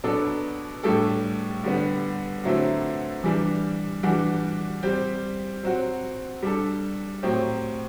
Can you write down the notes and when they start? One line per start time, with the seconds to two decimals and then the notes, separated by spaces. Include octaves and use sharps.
0.04 B2 F#3 B3 D4 A4
0.83 A2 G3 D4 A4
1.64 D3 G3 B3
2.43 D3 F#3 A3 C4 E4
3.24 E3 G3 D4
4.03 E3 G3 D4 F#4
4.83 G3 C4 G4
5.63 F#3 C4 F#4
6.42 G3 D4 A4
7.23 A2 F#3 C4 G4